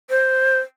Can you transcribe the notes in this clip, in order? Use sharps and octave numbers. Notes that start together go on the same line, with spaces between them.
C5